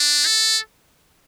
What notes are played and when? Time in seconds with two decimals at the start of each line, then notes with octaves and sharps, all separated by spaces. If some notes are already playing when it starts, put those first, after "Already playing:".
Already playing: D4
0.26 A4